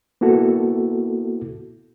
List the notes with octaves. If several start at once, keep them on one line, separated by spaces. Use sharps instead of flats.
A#3 B3 E4 F#4 A4